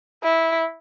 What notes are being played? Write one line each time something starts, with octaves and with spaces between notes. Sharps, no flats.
E4